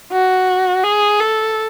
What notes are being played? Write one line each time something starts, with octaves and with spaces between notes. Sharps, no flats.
F#4
G#4
A4